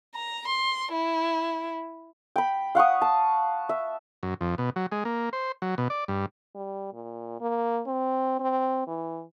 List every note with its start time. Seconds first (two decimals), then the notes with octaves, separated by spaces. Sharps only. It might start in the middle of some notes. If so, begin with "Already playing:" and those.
0.15 A#5
0.47 C6
0.92 E4
2.36 G5 B5
2.75 F5 F#5 C#6 D#6
3.02 A5
3.69 E5
4.23 F#2
4.41 F2
4.58 B2
4.76 F#3
4.92 G#3
5.05 A#3
5.33 C5
5.62 F#3
5.78 B2
5.90 D5
6.08 G2
6.55 G3
6.93 A#2
7.41 A#3
7.87 C4
8.40 C4
8.87 E3